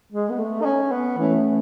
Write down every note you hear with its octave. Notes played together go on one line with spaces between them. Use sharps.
G#3
B3
A3
D#4
C#4
B3
E3 A3 C#4